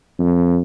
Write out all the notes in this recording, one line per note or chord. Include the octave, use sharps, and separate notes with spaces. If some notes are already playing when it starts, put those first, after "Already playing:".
F2